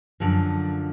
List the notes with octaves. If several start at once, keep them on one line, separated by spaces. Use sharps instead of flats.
F#2 D3 F3